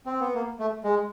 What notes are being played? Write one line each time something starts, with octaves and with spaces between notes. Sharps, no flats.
C4
B3
A#3
A3
G#3